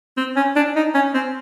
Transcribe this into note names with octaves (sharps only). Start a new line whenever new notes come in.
C4
C#4
D4
D#4
C#4
C4